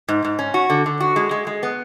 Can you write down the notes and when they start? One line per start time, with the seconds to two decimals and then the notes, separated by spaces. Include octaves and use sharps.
0.08 G#2
0.25 G#2
0.39 C#4
0.54 F#4
0.70 D3
0.86 D3
1.00 F#4
1.16 G#3
1.31 G#3
1.47 G#3
1.63 B3